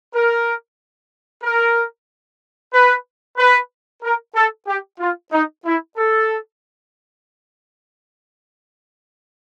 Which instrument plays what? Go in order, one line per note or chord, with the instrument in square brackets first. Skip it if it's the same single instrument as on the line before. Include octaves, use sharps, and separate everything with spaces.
[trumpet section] A#4
A#4
B4
B4
A#4
A4
G4
F4
D#4
E4
A4